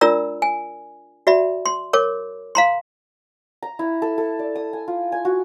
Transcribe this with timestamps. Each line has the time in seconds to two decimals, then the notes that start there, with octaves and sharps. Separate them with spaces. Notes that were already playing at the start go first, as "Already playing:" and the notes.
0.01 D4 F4 A#4 D5 A#5 E6
0.42 G#5
1.27 F#4 D5 E5 B5
1.66 C6
1.93 A#4 C#5 D6
2.55 F5 A#5 C6
3.62 A#5
3.79 E4
4.02 A4
4.18 A4
4.39 D5
4.56 D#6
4.73 G#5
4.88 F4
5.12 G#5
5.25 F#4